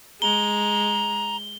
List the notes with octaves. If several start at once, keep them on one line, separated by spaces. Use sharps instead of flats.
G#3 A#5 G7